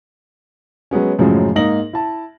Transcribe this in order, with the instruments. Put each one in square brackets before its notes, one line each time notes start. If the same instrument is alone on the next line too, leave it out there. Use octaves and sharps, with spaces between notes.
[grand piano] F#3 G#3 B3 C#4
F#2 A2 C#3 F3 F#3 G#3
G#2 A#3 D#4 A#6 F#7
E4 A5